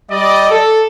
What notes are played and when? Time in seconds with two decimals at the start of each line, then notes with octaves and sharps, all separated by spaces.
0.10 G3 D5 D#5
0.50 A4